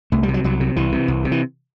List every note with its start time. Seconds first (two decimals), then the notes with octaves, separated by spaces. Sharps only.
0.12 C2 A3
0.23 G3
0.28 C3
0.34 F#3
0.44 C2 F#3
0.60 C3
0.76 C2 E3
0.92 C3
1.08 C2
1.25 C3
1.32 E3